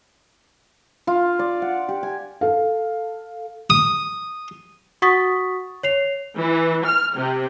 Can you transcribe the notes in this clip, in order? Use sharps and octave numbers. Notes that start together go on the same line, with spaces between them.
F4
D5
F#5
G4
G#5
A4 F5
D#6
F#4 F#5 C#6 D#6 A6 B6
C#5 C7 F7
E3
F6
C3